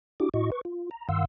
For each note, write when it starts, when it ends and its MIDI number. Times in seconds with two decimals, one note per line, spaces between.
0.20 0.29 62
0.20 0.29 64
0.20 0.29 66
0.20 0.29 67
0.20 0.29 86
0.34 0.50 45
0.34 0.50 64
0.34 0.50 66
0.34 0.50 75
0.34 0.50 85
0.52 0.61 71
0.52 0.61 85
0.65 0.90 65
0.91 1.08 82
1.09 1.25 43
1.09 1.25 51
1.09 1.25 77
1.09 1.25 78
1.09 1.25 84
1.09 1.25 88